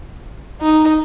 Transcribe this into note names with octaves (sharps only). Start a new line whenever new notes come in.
D#4